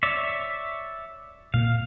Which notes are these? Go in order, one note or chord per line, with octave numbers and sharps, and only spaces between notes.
C#5 D5 E5
A#2 A#3 F5